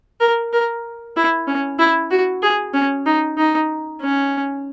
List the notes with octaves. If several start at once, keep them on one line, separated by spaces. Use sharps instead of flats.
A#4
A#4
E4
C#4
E4
F#4
G#4
C#4
D#4
D#4
C#4